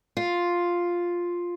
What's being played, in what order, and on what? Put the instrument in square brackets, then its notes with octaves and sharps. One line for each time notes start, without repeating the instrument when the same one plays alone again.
[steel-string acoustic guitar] F4